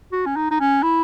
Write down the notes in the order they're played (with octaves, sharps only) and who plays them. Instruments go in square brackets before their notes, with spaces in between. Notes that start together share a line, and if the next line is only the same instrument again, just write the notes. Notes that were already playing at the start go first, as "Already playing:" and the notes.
[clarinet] F#4
C#4
D#4
D#4
C#4
E4